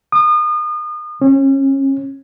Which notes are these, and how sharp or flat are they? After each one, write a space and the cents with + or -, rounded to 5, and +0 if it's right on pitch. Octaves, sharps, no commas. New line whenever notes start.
D#6 -35
C#4 -30